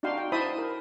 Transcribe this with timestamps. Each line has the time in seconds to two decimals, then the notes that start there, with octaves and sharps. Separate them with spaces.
0.03 D4 D#4 F#4 F5 G5 C6
0.18 G5
0.32 E4 C5 E5 A5 B5 D#6
0.58 A#4